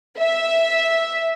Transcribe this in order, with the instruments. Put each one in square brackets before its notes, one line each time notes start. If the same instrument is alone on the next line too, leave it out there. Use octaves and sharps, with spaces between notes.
[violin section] E5